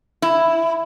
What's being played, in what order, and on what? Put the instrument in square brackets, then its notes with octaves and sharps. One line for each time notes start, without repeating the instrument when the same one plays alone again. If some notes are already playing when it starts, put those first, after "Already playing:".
[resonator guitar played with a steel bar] E4